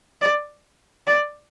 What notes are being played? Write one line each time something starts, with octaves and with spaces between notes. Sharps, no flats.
D5
D5